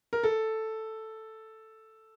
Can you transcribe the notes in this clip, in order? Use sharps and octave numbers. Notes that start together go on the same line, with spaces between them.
A#4
A4